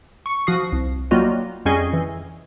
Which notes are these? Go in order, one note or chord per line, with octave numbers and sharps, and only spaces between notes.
C#6 C#7
F3 F#4 D#6 C7
C2
F#3 G3 A#3 F4 F#4 D#5
F2 G3 C#4 G#4 D#5 G#5
E3